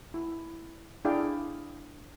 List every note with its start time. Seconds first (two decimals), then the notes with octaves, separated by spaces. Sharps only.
0.14 E4
1.05 D4 E4 G#4 D5 F5 G5